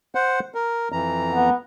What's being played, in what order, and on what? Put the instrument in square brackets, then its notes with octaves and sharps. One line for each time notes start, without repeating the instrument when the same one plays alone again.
[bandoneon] C5 F#5
A#4
F2 E3 A#5
[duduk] B3